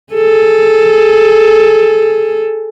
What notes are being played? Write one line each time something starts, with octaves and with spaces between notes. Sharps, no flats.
G#4 A4